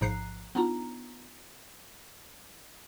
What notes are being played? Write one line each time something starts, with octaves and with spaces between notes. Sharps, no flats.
A1 G#2 F3 A#5 F#6 C7
B3 D4 D#4 F4 A#5